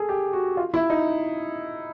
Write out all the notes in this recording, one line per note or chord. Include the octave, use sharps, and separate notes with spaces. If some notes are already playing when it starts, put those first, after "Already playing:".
Already playing: G#4 A4
G4
F#4
F4
E4
D#4